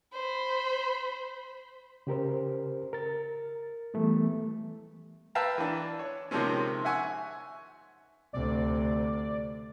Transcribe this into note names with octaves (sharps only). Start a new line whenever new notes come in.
C5 B5
C#3 G4 A#4 C5
A#4 A6
E3 G3 A3 B3
B4 E5 F5 G5 A5 A#5
E3 D4
C#5
C3 D#3 F3 G#3 C4 C#4
E5 F#5 G#5 C#6
D2 C3 D5